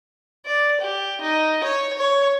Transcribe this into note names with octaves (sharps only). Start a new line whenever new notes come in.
D5
G4
D#4
C#5
C#5